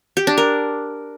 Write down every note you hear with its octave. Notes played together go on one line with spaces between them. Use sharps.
G4
D4
A#4